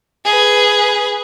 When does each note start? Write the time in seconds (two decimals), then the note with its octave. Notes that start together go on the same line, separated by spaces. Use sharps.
0.25 G#4 B4